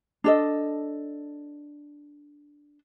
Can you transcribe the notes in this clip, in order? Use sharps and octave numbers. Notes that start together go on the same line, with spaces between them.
D4 A4 D#5